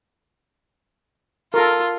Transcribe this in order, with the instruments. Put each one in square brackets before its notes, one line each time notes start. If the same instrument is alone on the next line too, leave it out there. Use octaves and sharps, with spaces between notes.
[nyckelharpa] F4 [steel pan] A4 A#4